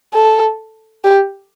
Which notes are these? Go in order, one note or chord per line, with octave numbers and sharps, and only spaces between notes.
A4
G4